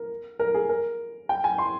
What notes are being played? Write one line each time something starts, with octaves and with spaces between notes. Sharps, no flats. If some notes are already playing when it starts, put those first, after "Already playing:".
Already playing: A#4
A#4
G#4
A#4
G5
G#5
C6